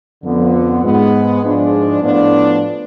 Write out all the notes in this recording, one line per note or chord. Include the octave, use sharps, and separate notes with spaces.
F2 D3 F3 B3
G#2 G#3 B3
G#2 F3 G#3 D4
A2 F3 B3 D4